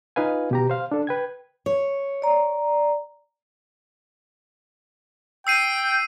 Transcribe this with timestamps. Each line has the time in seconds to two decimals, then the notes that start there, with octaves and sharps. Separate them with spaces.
0.16 D#4 F4 B4 F5 G#5
0.51 B2 G4 A#5
0.70 C5 F5
0.92 D4 A4
1.07 B4 G5 G#6
1.66 C#5
2.22 D5 A#5
5.47 G5 E6 C7 D#7